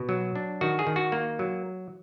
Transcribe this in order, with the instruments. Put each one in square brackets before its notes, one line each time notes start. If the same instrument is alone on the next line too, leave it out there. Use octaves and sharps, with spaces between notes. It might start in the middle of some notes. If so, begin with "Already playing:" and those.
Already playing: [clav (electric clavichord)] B2
F#3
D4
D#3 F#4
G#4
D#3
F#4
A#3
F#3